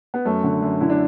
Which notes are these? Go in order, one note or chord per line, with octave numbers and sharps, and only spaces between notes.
B3
F#2 A3
D3
F#2
D3 E4
D4